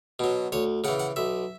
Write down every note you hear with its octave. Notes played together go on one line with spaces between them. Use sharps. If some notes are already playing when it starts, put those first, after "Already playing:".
B2 F#3
D2 C#5
C#3 E3 F#5
F#5
B1 E5